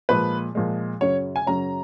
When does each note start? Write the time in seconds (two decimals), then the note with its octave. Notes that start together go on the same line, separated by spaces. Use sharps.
0.09 A#2 F3 G#3 B4
0.55 A#2 F3 G#3
1.01 F#2 C#3 F#3 C#4 C#5
1.36 G#5
1.46 F#2 C#3 F#3 C#4 A#5